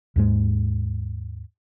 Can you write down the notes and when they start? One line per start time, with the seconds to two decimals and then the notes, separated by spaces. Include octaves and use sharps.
0.16 D#2 G#2 G#3